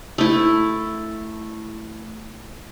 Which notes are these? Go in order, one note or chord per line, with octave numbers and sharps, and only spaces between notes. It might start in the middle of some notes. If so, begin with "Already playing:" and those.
A3 E4